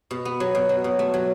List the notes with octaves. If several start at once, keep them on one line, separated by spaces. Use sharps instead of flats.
B2
B3
F#3
B2
F#3
B2
A3
F#3